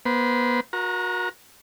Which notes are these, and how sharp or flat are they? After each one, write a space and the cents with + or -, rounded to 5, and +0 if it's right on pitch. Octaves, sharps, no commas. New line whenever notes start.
B3 -35 C5 -35
F#4 -30 A#4 +35 A#5 +0